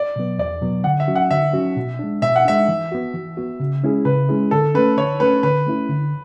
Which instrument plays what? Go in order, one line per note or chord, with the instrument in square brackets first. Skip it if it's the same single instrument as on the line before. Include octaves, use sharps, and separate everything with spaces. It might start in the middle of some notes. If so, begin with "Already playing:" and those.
Already playing: [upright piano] D5
[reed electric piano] B2 F#3 B3
[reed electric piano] E2 [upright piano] D5
[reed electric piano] B2 F#3 B3
[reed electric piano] D3 [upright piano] F#5
[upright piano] E5
[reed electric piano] F#3 C#4 F#4
[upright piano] F#5
[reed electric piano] D3 [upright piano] E5
[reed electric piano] F#3 C#4 F#4
B2
G#3 D4
[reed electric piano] B2 [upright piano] E5
[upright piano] F#5
[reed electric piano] G#3 D4 [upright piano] E5
[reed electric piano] E3
B3 F#4
E3
B3 F#4
C#3
G#3 C#4 E4 G#4
[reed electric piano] C#3 [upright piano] B4
[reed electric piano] G#3 C#4 E4 G#4
[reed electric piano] D3 [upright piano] A4
[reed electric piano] A3 C#4 [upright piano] B4
[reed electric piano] D3 [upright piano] C#5
[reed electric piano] A3 C#4 [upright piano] B4
[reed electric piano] D3 [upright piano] B4
[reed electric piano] A3 C#4 E4
D3